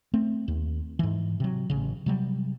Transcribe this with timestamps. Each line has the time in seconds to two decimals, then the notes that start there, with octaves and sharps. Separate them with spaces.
0.14 A3 C4
0.48 D#2
0.99 G#2 E3
1.40 C3 F#3
1.70 A1 C#3
2.06 C3 F#3 G3